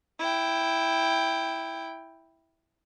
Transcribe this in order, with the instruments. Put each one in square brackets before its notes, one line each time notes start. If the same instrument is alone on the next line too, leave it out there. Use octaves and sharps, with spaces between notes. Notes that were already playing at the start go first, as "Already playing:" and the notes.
[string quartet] E4 G5